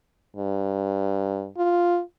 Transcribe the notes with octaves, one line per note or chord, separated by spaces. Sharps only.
G2
F4